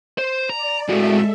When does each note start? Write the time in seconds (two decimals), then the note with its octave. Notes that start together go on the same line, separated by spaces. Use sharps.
0.18 C5
0.49 D5 A#5
0.88 A2 G#3 F#4 A4 E5